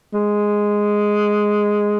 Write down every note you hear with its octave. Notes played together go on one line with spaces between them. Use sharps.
G#3